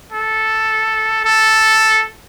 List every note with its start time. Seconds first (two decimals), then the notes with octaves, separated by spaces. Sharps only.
0.12 A4
1.25 A4